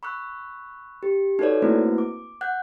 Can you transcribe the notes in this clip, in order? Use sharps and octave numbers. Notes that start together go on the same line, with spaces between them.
B5 C#6 E6 F#6
G4
D#4 F#4 A4 B4 C#5 D5
A3 A#3 C4 E4 F#4 B4
D6
F#5 F#6 G6